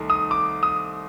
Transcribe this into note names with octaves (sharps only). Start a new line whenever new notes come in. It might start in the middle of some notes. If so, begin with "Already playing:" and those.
Already playing: C2 D#3 A3
D#6
D6
D#6